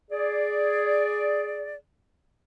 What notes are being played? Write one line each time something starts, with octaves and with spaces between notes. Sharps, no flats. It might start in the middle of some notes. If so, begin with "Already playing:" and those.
G#4 D5